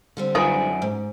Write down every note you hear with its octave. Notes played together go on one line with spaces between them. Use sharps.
D3 G3 C4
F#2 D#4 F4 B4 D5 G#5
G#2